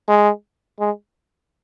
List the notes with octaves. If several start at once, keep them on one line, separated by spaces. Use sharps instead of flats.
G#3
G#3